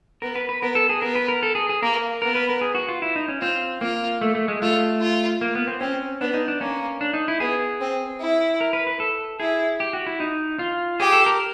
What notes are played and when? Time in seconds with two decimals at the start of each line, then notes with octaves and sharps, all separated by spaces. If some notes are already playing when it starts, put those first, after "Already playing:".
0.22 B3 A#4
0.35 B4
0.49 B4
0.62 B3 A#4
0.75 A4
0.89 G#4
1.02 B3 A#4
1.15 B4
1.28 A#4
1.43 A4
1.55 G#4
1.69 G#4
1.82 A#3 A#4
2.22 B3 A#4
2.35 B4
2.49 A#4
2.61 G#4
2.75 F#4
2.89 F4
3.02 E4
3.16 D#4
3.28 C#4
3.41 C4 F4
3.81 A#3 F4
4.21 A3
4.35 A3
4.48 G#3
4.62 A3 F4
5.01 F4
5.41 A#3
5.55 B3
5.67 C4
5.81 C4 C#4
6.21 B3 D4
6.34 D#4
6.48 D4
6.60 A#3 C#4
7.01 D4
7.14 D#4
7.28 E4
7.40 B3 G#4
7.81 C4
8.20 E4
8.61 A#4
8.73 B4
8.87 B4
9.00 A4
9.40 E4 G#4
9.80 G4
9.93 F#4
10.06 E4
10.20 D#4
10.59 F4
11.00 G4 G#4
11.12 A4
11.26 A#4